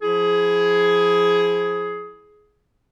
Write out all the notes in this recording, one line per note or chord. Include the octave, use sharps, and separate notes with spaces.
F3 E4 G#4